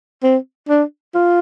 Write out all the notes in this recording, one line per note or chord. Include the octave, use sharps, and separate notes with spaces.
C4
D4
F4